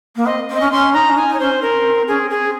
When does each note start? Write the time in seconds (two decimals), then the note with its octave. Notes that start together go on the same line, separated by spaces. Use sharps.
0.16 A#3
0.25 C4 D#5
0.49 C4
0.55 C#4 D#5
0.72 C#4 C6
0.94 D#4 A#5
1.09 C#4
1.16 D#4 G#5
1.28 D#4
1.34 C#5
1.40 C#4 C5
1.50 C4
1.62 A#4
2.08 C#4 G#4
2.19 C4
2.30 G#4
2.41 C4